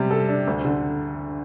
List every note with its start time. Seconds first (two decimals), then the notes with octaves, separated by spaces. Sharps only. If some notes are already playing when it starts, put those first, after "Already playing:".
Already playing: C3 G3
0.11 A4
0.29 D4
0.47 D2
0.65 D3